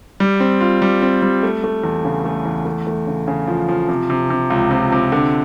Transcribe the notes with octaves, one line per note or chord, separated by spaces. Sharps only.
G3
C4
F4
G3
C4
G3
A3
A3
E2
C#3
A3
E2
A3
A3
C#3
C#3
F3
F3
C3
C3
C3
C#2
C3
C3
D3